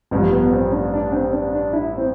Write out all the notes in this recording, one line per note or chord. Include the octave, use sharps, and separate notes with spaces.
A1 G2 F3
B3
C4
D4
D4
C4
D4
D4
E4
C4